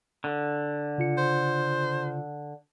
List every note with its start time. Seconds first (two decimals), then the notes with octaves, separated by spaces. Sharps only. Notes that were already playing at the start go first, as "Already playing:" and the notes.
0.24 D3
0.98 C#3 F4 C#7
1.18 C5